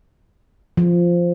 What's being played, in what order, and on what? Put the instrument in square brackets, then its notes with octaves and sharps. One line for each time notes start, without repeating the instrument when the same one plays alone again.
[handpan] F3